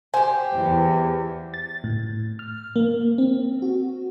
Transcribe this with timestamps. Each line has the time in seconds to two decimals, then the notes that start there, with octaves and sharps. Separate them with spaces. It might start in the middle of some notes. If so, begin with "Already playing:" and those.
0.14 G4 C5 G#5
0.56 E2
1.54 A6
1.84 A2
2.39 F6
2.76 A#3
3.18 C4
3.62 F#4